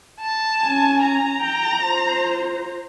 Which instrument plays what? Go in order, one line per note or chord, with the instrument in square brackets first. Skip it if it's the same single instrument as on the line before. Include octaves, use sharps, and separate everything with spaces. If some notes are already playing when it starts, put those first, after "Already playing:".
[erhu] A5
[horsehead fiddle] C#4 G#5
[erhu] A#5
[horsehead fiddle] G5
F4 C5